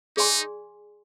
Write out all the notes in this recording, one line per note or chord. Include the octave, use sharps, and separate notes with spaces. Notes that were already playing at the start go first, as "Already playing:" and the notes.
D#4 G#4 D5 G#5 C6